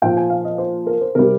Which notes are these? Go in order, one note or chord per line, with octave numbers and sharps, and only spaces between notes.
A#2 F3 G5
G#5
F5
D#5
C5
A#4
C5
C3 G3 A#4